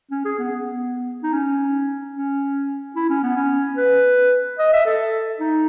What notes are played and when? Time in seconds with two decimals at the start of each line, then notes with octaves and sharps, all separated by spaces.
0.11 C#4
0.25 G#4
0.38 B3
0.52 B3
1.23 D#4
1.33 C#4
2.15 C#4
2.96 E4
3.10 C#4
3.23 B3
3.36 C#4
3.77 B4
4.59 D#5
4.73 E5
4.86 A4
5.40 D#4